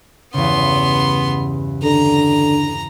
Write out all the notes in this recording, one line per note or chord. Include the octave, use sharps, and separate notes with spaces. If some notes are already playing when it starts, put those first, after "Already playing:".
E2 G2 C#3 B3 C6
D3 A#5